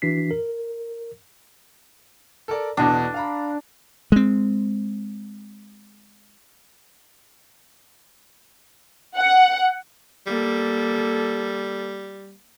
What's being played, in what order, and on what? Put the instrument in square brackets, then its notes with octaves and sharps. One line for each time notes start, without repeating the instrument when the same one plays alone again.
[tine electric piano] E3 D4 F#4 B6 C7
A#4
[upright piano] A4 A#4 D5
[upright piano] E2 B2 [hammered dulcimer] D4
[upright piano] F5 A#5 B5
[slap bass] G#3 C4
[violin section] F#5
[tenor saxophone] G3 [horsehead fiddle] A#3 A4